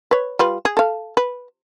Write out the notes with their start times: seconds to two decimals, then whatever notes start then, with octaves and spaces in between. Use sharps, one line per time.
0.11 B4 C#5
0.39 G3 F4 B4
0.65 G#4
0.77 A4 F5
1.17 B4